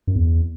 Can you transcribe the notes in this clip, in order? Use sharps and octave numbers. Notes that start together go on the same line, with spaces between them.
F#2
E2